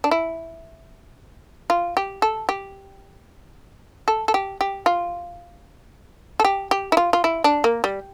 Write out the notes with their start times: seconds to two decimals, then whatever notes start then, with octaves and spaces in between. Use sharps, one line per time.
0.04 D4
0.11 E4
1.70 F4
1.97 G4
2.22 A4
2.49 G4
4.08 A4
4.28 A4
4.34 G4
4.61 G4
4.86 F4
6.40 A4
6.45 G4
6.71 G4
6.92 E4
6.97 F4
7.13 F4
7.24 E4
7.44 D4
7.64 A#3
7.84 G3